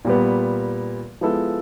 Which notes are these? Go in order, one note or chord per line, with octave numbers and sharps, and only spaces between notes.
A#2 G3 B3
F3 G#3 B3 E4 A4